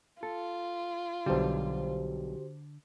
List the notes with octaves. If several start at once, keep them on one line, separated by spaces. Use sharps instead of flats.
F4 A4
B1 D3 G3 F#4 G4 C5